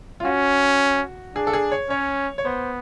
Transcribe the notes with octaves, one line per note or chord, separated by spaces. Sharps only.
F4
C#4 F#4
D4 G#4
A4
G#4
C#5
C#4 C#5
C#5
B3 C5